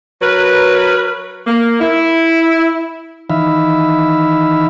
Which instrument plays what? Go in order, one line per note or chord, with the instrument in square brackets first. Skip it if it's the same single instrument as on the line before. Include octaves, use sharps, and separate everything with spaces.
[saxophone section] F#3 A#4 B4
A#3
E4
[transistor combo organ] D#3 E3 D#4 E5 F5 B5